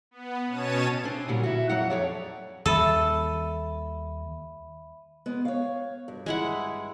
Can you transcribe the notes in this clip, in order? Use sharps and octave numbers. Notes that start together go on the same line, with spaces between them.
B3
B2 C#4 C#5 A5 D#7
C4 D4
A#2 D3 F#3 G3
E4 F#4
F2 F#3 F#5
F2 C#5 D5
D#2 G3 A4 E5 B5 D#7
G#3 B3
C#5 F5
G2
G#3 E4 F#5